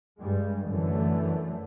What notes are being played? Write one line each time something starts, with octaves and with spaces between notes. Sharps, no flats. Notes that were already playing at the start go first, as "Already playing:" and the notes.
G2 G3 G#3
F#2 D3 E3 A3